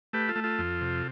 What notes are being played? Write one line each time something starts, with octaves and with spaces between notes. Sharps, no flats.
A3 G4 B4
F4 A4
A3
F4 A4
F2
C3